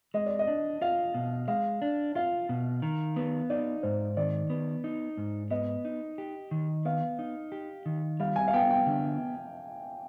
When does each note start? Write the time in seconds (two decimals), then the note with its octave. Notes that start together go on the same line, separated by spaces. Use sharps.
0.14 G#3 D#5
0.26 D5
0.39 D#5
0.47 D4
0.81 F4 F5
1.14 B2
1.48 G#3 F5
1.82 D4
2.15 F4 F5
2.49 B2
2.82 D#3
3.16 B3
3.50 D#4 D5
3.83 G#2 C5
4.17 D#3 D5
4.50 B3
4.84 D#4
5.17 G#2
5.51 B3 D#5
5.85 D#4
6.18 G4
6.51 D#3
6.85 B3 F5
7.19 D#4
7.52 G4
7.86 D#3
8.20 G3 F5
8.36 G#5
8.48 F5
8.53 B3 G5
8.70 G5
8.86 D3